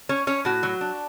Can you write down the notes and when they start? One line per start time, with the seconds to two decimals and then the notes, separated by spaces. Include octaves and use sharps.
0.09 C#4 C#5
0.27 C#4 C#5
0.45 A2 F#4
0.63 F#3
0.81 D4